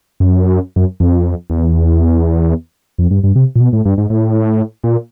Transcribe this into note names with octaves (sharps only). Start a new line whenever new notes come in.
F#2
F#2
F2
E2
F2
G2
G2
C3
A#2
B2
A2
G2
G#2
A2
A#2